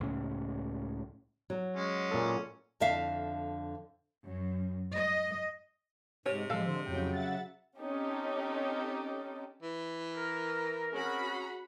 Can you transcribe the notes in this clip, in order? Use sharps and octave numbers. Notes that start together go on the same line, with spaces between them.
C#2 A2 C#3
F#3
G#3 C#4
A#2 A4
F2 D3 E5 F5
F#2
D#5
G#2 C3 C#5
A2 F3 G#3 A4 F5
D3 G#3 C5
F2 A2 C#3 F#3 G5
E5 F#5 A6
C4 C#4 D#4 G4 A4
E3
A#4
C4 C#4 F#4 G#4 F#5 B5